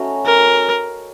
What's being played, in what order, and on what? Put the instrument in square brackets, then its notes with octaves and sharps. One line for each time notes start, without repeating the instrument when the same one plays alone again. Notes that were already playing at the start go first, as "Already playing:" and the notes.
Already playing: [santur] A3 C#4 D#4 F#4
[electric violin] A#4